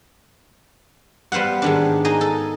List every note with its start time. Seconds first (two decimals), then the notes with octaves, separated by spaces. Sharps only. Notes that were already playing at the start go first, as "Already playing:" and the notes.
1.32 G3 B3 C5 F5 F#5
1.62 G#2 D#3 D4
2.05 D#4 G#4 D#5
2.21 A4